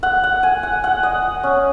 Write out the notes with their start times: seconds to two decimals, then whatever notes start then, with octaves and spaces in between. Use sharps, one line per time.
0.03 F#5
0.24 F#5
0.43 G#5
0.63 F#5
0.84 F#5
1.03 D#5
1.43 C#4